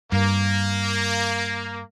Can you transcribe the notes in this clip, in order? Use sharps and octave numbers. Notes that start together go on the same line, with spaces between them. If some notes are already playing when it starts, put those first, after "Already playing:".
G2 A#3